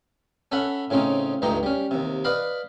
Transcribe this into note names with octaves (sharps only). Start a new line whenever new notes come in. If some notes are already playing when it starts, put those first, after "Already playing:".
C#4 A4 E5 F#5 B5
A2 C#3 C4 C#4 D#4
C#2 G2 A3 D#4 G4 A#5
G3 C#4
D#2 C3
B4 D5 D#5 F5 B5